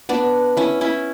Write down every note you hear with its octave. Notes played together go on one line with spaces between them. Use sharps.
B3 D4
C#4 E4
C#4 E4